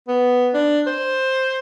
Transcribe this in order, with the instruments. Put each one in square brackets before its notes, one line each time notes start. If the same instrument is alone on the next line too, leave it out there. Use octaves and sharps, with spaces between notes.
[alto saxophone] B3
D4
C5